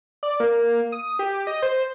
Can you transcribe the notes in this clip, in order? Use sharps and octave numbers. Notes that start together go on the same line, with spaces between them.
D5
A#3
D#6
G4
D#5
C5